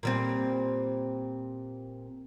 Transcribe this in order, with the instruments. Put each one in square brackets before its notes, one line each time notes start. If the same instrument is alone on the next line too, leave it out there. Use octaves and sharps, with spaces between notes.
[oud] A#2 G3 C4